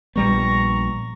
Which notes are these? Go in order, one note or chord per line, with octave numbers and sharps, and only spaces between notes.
A#1 G3 B3 A#5 C#6